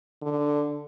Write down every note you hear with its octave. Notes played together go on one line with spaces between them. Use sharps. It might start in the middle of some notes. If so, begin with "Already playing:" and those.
D3